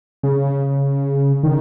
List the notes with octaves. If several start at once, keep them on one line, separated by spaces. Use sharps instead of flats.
C#3
D#3